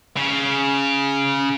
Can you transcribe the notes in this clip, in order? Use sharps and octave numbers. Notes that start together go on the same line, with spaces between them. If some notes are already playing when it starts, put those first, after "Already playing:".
C#3